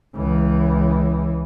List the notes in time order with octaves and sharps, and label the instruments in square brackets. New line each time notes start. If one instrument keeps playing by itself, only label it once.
[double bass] C#2 E3